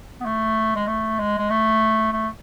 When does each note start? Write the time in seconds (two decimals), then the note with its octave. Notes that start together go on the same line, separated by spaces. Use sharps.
0.21 B3
0.26 A3
0.76 G#3
0.87 A3
1.19 G#3
1.38 G#3
1.50 A3
2.12 A3